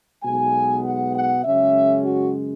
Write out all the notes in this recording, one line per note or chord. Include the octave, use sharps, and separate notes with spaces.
B1 B2 G#3 B3 G#5
F#5
F#5
F#2 C#3 G#3 C#4 E5
F#4